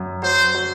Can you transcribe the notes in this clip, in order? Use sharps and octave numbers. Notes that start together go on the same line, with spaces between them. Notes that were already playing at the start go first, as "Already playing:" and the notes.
Already playing: F#2
F#3 C5
F#3